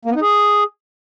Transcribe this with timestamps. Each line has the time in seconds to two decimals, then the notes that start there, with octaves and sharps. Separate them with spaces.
0.05 A#3
0.11 B3
0.16 D#4
0.21 G#4